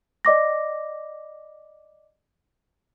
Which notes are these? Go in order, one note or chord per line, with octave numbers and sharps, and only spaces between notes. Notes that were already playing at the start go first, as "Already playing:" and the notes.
D5 D#5 D6 A#6